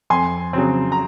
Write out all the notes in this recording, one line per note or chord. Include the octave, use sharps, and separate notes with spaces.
F2 G#5 C6
C#3 F#3 C4
A#5